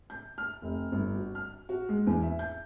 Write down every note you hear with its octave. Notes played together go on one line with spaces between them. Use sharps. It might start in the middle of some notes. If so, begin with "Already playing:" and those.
G6
F6
F1
G1
F#4
F6
F#4
G#3
E2
E5
G6